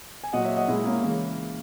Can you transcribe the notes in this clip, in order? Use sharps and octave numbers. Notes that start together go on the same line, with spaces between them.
G#5
A#2 F#3 D#5 F#5
C#5 E5
D#5 F#5
A#2 G#3 E4 G#4
A#3 C#4
C#3 E3 G#3 A#3